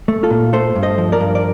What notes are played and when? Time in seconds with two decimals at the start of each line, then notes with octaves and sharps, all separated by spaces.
0.08 A3
0.23 F4 A4
0.30 A#2
0.53 A3 A4 C5
0.75 G2
0.83 C5 D#5
0.98 F3
1.12 A#4 D5
1.20 G2
1.35 D5